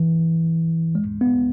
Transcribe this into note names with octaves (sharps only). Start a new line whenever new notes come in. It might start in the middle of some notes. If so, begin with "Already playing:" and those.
Already playing: E3
G#3
B3